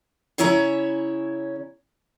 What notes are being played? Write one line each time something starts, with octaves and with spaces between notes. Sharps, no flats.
C#3 C#4 E4 C#5 A#5